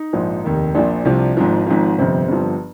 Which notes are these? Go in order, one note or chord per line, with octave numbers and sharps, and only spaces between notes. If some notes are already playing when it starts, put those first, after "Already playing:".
Already playing: D#4
A#1 G#2 F3
F1 D#2 D#3
A#1 A#2 F3 D4
C2 C3 F3
G#1 G#2 F3
G#1 G#2 F3
G1 F2 C3 C4
G1 G2 F3